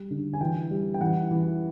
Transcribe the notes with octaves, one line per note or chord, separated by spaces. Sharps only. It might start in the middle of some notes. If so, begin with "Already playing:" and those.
Already playing: G3
D3
G#5
E3 G5
G3
G5
E3 F#5
E3